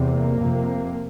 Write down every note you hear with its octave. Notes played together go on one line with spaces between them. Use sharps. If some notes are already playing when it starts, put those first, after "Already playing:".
Already playing: E2 C3
A#3
F2 C3